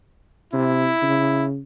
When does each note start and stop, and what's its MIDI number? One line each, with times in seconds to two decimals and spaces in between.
0.53 0.90 48
0.53 1.46 64
1.02 1.61 49